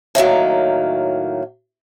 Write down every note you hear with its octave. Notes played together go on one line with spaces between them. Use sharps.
A2 D#3 F#3 A#3